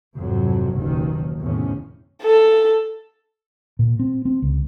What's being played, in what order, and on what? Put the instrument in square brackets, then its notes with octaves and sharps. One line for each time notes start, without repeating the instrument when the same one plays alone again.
[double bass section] G#1 F2 C3 F#3
F#1 D#2 B2 D#3
E2 A2 C3 D#3 C#4
[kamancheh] A4
[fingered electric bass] A#2
C4
C4
C#2